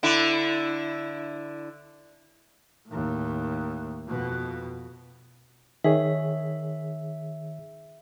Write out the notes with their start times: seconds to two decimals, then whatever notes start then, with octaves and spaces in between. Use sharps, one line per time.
0.03 D3 E4
2.88 D#2 A2
4.08 F2 B2
5.84 D#3 G#4 C#5 E5